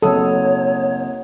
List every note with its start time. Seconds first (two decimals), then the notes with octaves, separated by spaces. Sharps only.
0.02 F#1 B1 A#3 C4 A4 C#5 F#5 D#6